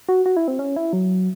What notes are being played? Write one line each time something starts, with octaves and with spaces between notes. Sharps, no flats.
F#4
F#4
E4
C4
C#4
E4
F#3